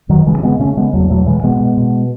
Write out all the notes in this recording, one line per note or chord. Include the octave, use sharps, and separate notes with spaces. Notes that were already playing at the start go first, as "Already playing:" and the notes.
F#2 D#3 F#3
C#3 E3 G#3
C#4
C#3 G#3 B3
C#3 A3 C#4
C#3 G#3 B3
E2 F#3 A3
B2 F#3 A3
B2 E3 G#3
B2 G#3 B3
B2
B2